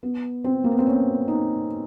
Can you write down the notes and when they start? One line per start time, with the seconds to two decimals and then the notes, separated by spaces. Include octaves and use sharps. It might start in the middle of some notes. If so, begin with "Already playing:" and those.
0.03 B3
0.44 C4
0.64 A#3
0.71 B3
0.79 C4
0.86 C#4
1.28 D#4